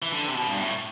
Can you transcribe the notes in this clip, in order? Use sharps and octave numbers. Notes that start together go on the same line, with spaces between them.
E3
D3
C3
B2
G2
A2